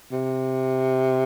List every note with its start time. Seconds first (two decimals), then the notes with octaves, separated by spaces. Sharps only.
0.12 C3